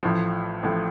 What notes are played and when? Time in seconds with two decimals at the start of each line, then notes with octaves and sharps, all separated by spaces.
0.03 A1 A2 F3
0.63 A1 A2 F3